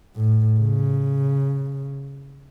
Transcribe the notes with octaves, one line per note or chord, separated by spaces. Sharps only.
A2
C#3